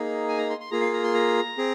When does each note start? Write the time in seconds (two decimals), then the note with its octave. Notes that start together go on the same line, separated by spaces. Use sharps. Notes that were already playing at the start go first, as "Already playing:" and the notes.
Already playing: A#3 D#4 G#4
0.29 G#5
0.38 A#5
0.50 C6
0.60 C6
0.71 A#3 F4 G#4 A#5
0.81 F5
0.93 A#5
1.04 C6
1.14 A#5
1.58 C4 G#4